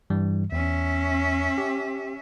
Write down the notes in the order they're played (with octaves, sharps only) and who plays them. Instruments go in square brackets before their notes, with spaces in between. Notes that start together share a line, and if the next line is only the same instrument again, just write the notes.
[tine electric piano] G2 E3 G3
[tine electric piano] E2 [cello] C#4 E5
[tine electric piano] G4